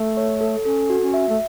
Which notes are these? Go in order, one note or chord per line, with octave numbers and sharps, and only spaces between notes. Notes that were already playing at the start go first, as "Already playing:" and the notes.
Already playing: A3
C#5
A4
C#4 A4
F#4
C#4
E5
A3